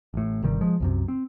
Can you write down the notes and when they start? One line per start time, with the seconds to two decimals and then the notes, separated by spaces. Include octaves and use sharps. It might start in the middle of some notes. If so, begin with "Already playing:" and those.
0.14 A1 A2
0.42 G1 C3 D#3 G3
0.61 F3 G#3
0.80 C2 F#2 C3
1.08 C4